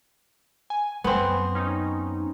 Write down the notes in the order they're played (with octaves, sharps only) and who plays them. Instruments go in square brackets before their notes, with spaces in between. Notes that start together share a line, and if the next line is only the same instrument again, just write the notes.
[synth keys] G#5
[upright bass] F#2 [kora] B3 C4
[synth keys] C#4 D#4